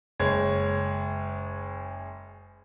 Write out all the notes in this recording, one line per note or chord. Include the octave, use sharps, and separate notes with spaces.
F#1 G#3 C#5